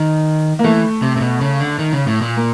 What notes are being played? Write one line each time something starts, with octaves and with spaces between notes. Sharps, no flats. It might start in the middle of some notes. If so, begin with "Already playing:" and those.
Already playing: D#3
A#3
E3 A3
C3
C3
B2
C#3
D3
D#3
C#3
A2
A#2
A#3